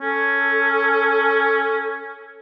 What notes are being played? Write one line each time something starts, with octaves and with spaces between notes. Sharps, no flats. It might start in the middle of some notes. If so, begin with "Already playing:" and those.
C#4 A4